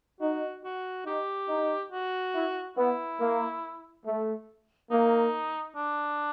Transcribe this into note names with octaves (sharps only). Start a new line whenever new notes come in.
D#4 F#4
F#4
D#4 G4
D#4
F#4
E4
B3 E4
A#3
A3
A#3 D#4
D4